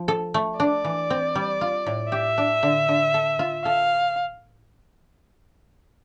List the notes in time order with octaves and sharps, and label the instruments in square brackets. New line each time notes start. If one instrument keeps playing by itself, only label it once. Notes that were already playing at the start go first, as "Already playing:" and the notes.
Already playing: [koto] F3
A4
A3
[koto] D4 [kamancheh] D5
[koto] E3
C4
G3
F4
A2
[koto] G4 [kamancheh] E5
[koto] D4
D3
D3
A4
F4
[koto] A4 [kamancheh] F5